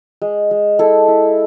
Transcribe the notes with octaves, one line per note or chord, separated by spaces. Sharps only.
G#3
G#3
E4 A4
E4